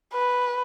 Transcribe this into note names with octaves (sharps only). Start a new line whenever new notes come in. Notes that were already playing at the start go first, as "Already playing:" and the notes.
B4